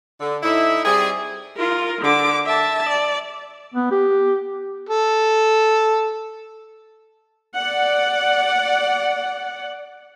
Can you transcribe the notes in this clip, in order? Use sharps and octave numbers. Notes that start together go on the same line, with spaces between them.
D3
A2 D#4 E4
G3 C4 G#4
F4 A#4
D3 D6
E5 A5
D5
B3
G4
A4
D5 F#5